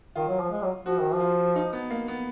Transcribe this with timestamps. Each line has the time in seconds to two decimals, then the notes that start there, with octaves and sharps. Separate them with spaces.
0.15 D#3 F4
0.28 F#3
0.40 F3
0.51 G#3
0.63 F#3
0.86 F3 F#4
0.99 D#3
1.13 F3
1.20 F4
1.56 D#4
1.73 B3
1.90 A#3
2.08 B3